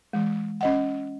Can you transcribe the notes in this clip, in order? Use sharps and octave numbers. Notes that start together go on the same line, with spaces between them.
E3 G#3
C#4 D#5 F#5